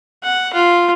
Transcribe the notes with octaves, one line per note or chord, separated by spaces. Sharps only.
F#5
F4